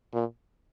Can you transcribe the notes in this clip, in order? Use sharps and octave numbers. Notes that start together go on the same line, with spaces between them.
A#2